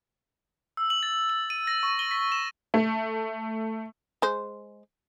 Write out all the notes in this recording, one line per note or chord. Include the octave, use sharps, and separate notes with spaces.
E6
F#7
A6
F#7
D#7
A#6
C#6
G7
B6
E7
A3
G#3 C5